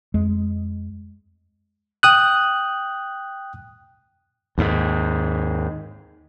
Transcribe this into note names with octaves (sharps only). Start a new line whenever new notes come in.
F2 G#3
G5 D#6 F#6
D#2 G#2